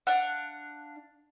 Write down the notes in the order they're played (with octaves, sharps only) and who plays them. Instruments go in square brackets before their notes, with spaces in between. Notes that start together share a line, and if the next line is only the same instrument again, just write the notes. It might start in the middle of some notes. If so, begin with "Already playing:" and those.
[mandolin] D4 F5 F#5